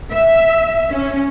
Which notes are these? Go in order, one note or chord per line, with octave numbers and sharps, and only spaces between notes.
E5
C#4